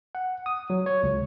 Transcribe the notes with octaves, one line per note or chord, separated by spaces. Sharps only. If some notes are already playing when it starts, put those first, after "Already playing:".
F#5
D#6
F#3
C#5
C#2